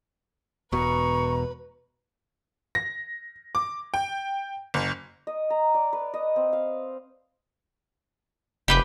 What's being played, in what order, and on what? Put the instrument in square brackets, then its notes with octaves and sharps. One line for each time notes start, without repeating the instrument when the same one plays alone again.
[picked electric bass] E1 B2 [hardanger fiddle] B4 [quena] A#5 [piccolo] C#6
[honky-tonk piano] A#6
D6
G5
F#1
[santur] D#5
A#5
D5
B4
D#5
C4
F5
[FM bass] F1 [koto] G4 B4 G5